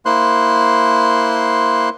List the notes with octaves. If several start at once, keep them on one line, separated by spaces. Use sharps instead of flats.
A#3 E4 C5 C6 F#6